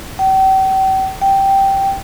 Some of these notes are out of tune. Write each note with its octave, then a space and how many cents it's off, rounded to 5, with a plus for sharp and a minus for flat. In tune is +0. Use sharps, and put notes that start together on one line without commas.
G5 -40
G5 -5